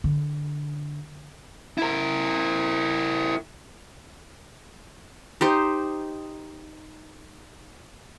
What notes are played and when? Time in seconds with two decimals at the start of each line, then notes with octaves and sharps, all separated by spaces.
0.04 D3
1.78 E4 A#4
5.41 D#4 G4 C5